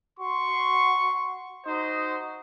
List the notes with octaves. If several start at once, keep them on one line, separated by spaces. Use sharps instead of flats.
F#4 C6 C#6
D#4 F#4 C5 D#5